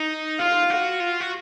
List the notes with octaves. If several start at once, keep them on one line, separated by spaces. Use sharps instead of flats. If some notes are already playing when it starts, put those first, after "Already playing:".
Already playing: D#4
F4 F5
F#4
F4
F#4